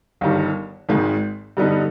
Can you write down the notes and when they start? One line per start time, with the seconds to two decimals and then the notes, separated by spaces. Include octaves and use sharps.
0.21 G1 G2 D#3
0.89 G#1 G#2 D#3
1.57 G2 D3 G3 B3 D#4